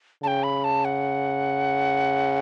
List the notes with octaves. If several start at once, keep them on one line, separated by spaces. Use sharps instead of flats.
C#3 G5 A5
B5
A5
F#5